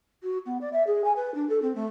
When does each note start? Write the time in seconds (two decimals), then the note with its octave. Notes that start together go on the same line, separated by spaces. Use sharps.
0.23 F#4
0.45 B3
0.61 D5
0.72 E5
0.86 G#4
1.04 G#5
1.16 B4
1.34 D4
1.49 A4
1.62 C4
1.75 A3